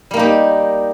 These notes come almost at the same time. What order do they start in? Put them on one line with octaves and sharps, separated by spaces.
G3 A#3 D#4 G4